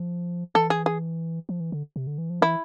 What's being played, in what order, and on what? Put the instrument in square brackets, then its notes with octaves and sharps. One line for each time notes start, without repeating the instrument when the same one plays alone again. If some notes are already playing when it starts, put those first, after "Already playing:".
Already playing: [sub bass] F3
[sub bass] E3 [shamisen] A4
[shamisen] G#4
G#4
[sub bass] F3
E3
D3
C3
D3
E3
F3
[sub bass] E3 [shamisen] E4